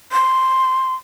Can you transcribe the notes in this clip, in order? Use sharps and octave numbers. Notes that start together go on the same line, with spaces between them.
C6